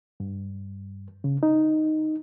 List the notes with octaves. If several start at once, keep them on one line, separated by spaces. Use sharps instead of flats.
G2
C#3
D#4